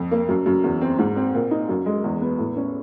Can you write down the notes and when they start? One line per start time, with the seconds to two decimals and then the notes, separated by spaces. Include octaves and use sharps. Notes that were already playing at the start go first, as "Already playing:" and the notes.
Already playing: F2
0.11 A#3
0.28 F#2
0.46 F#2
0.64 E2
0.81 C4
0.99 G#2
1.16 C4
1.34 A#2
1.51 D#4
1.69 F#2
1.86 G#3
2.04 E2
2.21 B3
2.38 A2
2.56 C#4